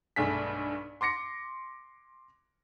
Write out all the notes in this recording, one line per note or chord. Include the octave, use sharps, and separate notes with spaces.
B1 G2 A3 G#4 B6
C6 D6 A#6 C#7